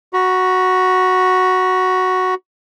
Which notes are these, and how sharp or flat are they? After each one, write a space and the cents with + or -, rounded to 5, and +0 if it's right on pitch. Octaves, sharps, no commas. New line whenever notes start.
F#4 +0 B5 -45